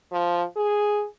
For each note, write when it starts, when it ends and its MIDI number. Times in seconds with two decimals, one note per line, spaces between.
0.12 0.44 53
0.56 1.05 68